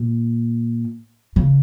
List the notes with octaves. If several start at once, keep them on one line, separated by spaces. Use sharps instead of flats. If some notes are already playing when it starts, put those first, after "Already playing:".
Already playing: A#2
C#3